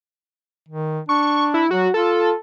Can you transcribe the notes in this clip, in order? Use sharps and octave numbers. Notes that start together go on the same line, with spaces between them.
D#3
D4 C#6
E4
F#3 F#4
F4 A4